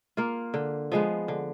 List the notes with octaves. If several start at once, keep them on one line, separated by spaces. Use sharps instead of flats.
A#3 F4
D3
F3 G#3 B3
D3